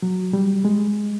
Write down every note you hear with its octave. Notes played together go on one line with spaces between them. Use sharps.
F#3
G3
G#3